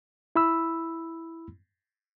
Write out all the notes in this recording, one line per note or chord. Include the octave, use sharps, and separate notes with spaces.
E4 B5 E6